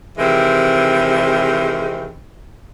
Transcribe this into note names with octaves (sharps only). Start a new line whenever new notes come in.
C3 D#3 E3 G#3 C4